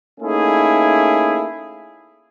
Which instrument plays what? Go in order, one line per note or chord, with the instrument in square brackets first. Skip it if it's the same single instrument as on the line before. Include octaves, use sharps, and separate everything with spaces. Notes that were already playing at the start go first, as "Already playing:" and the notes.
[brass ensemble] A3 A#3 C#4 D#4 E4 G#4